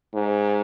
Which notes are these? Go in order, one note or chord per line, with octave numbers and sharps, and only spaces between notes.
G#2